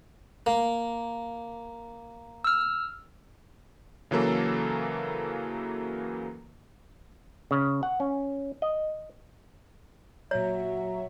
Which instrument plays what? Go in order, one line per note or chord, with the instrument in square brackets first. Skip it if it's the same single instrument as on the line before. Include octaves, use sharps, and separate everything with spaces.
[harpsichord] A#3
[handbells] E6 F6
[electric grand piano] C#3 E3 F#3 A#3 A4
[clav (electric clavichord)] C#3
F#5
C#4
D#5
[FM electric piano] A#2 A#5 [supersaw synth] F#3 [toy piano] C#5 [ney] E5